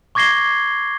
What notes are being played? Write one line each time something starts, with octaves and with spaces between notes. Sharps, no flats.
C#6 D6 G#6 A#6 C7 G7